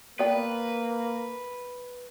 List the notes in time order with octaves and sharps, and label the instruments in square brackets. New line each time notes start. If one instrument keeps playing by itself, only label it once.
[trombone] A#3 [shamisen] B3 D5 G5 [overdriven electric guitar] B4